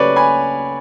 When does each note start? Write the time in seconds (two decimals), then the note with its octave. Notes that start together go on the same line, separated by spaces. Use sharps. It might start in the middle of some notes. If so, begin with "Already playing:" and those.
Already playing: C#3 F#3 A3 C#4 B4 C#5 D5
0.16 G#5 B5